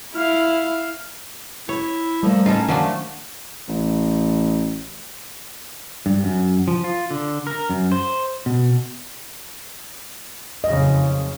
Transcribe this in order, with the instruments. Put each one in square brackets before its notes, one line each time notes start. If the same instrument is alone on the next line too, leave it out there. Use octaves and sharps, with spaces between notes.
[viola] E4 F5
[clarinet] E4 [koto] C#5
[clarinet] F3 [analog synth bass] G3 [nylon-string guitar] A3 A#3
[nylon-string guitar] A2 D#3 D#4 [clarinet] C#4 [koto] F4 A4
[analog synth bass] D#3 [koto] F3 F#3 D4 [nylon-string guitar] A#3
[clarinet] A3
[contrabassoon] A1
[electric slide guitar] G2
F#2
F3
F4
D3
A#4
F#2
C5
B2
[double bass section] F#1 F2 C#3 [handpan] D#5